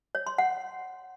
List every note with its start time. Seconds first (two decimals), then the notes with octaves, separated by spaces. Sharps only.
0.15 C#5
0.27 C6
0.38 F#5